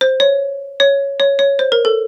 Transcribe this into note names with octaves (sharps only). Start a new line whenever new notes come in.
C5
C#5
C#5
C#5
C#5
C5
A#4
A4